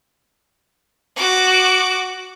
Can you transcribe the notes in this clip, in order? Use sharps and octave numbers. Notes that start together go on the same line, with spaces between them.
F#4 D6